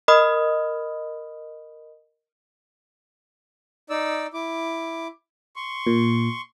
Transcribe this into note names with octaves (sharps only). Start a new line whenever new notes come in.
A#4 D#5 B5 D#6 F6
D#4 D5 E6
E4 D6
C6 C#6
A#2